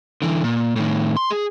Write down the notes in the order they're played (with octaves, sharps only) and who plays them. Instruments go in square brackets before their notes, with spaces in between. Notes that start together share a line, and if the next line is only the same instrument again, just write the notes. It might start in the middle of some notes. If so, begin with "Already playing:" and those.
[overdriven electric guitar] D3 E3
A#2
A2 D#3
C6
G#4